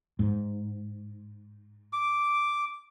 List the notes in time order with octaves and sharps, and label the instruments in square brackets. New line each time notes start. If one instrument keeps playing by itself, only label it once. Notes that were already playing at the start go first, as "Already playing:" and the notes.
[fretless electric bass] G#2
[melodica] D6